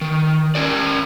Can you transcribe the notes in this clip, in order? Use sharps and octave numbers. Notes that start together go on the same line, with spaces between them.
D#3
C#4 A#4 D5